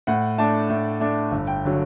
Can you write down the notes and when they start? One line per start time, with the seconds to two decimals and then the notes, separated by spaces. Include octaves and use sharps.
0.07 A2 F#5
0.38 A3 D4 A5
0.70 A2
1.00 A3 D4
1.31 G1
1.47 G5
1.65 D3 F#3